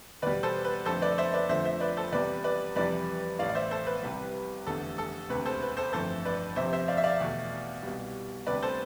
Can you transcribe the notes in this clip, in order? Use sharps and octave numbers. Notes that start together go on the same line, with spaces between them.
E2 B2 G3 B4 D5
A4 C5
B4
F2 D3 A3 A4 C5
B4 D5
C5 E5
B4 D5
F2 D3 F3 A3 C5 E5
C5 E5
B4 D5
A4 C5
E2 C3 G3 B4 D5
B4 D5
F2 C3 E3 G3 B4 D5
A1 A2 E3 D5 F5
D5
C5 E5
A4 C5
B4
C2 C3 G3
F1 E2 D3 A3 A4
A4
E1 D2 C3 B4
A4 C5
B4
A4 C5
G1 F2 E3 A3 A4 C5
B4 D5
F1 F2 C3 C5 E5
C5 E5
D5 F5
E5
D5 F5
E2 B2 A3
C2 B2 G3
D2 C3 G3 B4 D5
A4 C5